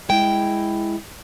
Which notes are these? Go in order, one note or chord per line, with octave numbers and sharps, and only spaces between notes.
G#3 E4 G5